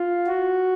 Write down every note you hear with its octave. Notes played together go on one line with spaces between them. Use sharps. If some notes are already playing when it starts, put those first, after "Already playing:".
Already playing: F4
F#4